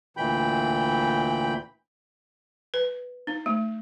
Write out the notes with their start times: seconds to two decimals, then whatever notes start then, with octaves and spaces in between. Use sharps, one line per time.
0.17 D2 A#2 E3 G5 B5 G6
2.74 B4
3.27 D#4
3.46 A3